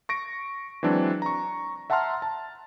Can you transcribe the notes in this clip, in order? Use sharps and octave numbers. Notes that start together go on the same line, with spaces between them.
C#6 A#6 D7
E3 F#3 G#3 C4 D4
A#5 C#6
E5 F#5 A5 A#5 C6 F6
A5